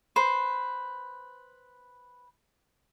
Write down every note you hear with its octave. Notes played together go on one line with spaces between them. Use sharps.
B4 C5